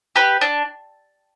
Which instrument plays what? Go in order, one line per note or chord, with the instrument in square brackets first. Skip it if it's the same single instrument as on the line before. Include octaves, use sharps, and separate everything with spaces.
[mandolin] G4 B4
D4